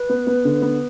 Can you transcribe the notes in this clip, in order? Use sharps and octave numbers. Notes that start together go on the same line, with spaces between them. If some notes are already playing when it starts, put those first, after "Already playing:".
Already playing: B4
B3
B3
D3
B3